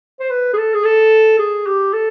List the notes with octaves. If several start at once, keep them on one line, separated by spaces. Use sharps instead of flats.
C5
B4
G#4
A4
G#4
A4
G#4
G4
A4